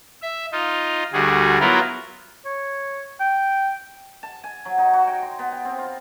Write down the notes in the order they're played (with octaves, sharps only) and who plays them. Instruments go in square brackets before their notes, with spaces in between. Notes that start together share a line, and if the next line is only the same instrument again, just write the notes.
[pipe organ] E5
D#4 F4
D2 G3 F#4 G#4
F#3 B3 E4 F4 A#4
[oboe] C#5
G5
[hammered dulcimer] A5
G#5
F#3
D#4
F#4
G5
C6
B3
G5
C4
F4